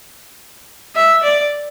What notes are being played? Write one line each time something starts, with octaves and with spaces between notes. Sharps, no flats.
E5
D5